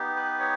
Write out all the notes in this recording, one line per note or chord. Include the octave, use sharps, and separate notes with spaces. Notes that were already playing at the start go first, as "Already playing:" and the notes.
Already playing: B3 D#4 G4
B4
C#5